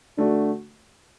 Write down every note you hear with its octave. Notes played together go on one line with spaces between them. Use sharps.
D3 A3 D4 F#4